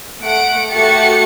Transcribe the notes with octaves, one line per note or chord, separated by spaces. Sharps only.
A3 F#5 D7
A3 F#4 G4 A6 C#7